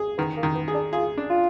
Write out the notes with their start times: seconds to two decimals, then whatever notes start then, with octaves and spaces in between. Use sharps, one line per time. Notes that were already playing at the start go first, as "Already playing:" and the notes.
Already playing: G#4
0.18 D#3 B3
0.37 A#3
0.43 D#3
0.55 B3
0.68 G#4
0.74 D4
0.93 F4 G#4
1.18 D4
1.30 F4